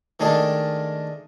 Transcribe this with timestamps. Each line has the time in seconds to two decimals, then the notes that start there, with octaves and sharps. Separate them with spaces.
0.20 D#3 G#3 A3 D4 A4